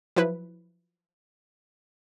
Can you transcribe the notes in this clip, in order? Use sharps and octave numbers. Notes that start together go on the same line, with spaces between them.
F3 F#3 E4 B4